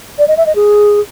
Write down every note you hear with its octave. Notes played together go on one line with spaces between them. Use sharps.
D5
D#5
E5
D#5
G#4